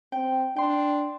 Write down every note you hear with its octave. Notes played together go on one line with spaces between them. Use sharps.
C4 G5
D4 G5 C6